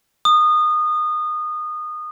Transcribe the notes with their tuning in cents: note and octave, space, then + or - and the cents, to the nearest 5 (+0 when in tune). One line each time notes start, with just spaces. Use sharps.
D#6 -25